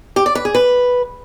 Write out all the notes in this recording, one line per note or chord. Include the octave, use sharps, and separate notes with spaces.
G4
D5
B4
G#4
B4